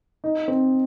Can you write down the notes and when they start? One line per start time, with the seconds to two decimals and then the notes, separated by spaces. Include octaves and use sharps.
0.24 D#4
0.48 C4